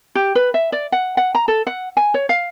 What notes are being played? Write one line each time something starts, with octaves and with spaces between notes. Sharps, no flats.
G4
B4
E5
D5
F#5
F#5
A#5
A4
F#5
G#5
C#5
F5